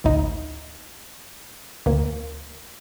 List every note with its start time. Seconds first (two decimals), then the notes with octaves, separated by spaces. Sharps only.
0.04 A1 D2 D#4
1.86 D2 A#3